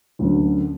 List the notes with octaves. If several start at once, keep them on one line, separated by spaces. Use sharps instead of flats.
D2 D3 F#3 A#3 C#4